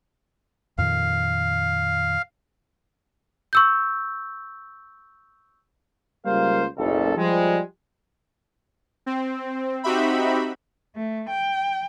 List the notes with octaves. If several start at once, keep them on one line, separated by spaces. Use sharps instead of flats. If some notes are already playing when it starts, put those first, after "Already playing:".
F2 A#2 D#3 F5
C#6 E6 G6
C#2 G3 A#3 A#4 C5 F5
F#1 B1 A4
F3 G3 G#3
C4
C4 D#4 F#4 G4 E5 B5
A3
G5